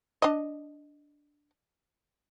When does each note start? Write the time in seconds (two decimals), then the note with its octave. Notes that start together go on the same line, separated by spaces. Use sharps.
0.22 D4 D#5